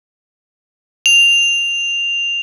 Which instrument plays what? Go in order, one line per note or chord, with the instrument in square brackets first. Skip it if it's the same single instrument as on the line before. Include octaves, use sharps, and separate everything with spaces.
[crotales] F7